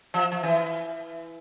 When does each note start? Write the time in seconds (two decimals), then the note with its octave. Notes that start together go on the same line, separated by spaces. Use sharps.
0.14 F3
0.32 F3
0.43 E3